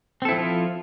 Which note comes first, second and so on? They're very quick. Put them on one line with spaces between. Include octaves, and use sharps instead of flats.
C4 A4 E4 F3 F4